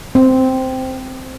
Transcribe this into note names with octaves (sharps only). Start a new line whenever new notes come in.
C4